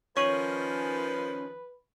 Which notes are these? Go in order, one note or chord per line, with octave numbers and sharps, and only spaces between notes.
D#3 F3 C#4 B4 C#6 D#7 F#7